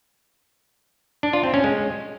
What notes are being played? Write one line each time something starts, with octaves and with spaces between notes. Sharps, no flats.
D4
F4
C4
C#4
G#3